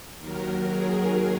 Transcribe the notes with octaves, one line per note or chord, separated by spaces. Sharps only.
D#2 D#3 F#3 A#4
G#4